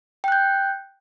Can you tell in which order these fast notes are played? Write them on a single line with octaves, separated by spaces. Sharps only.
G5 F#6 G6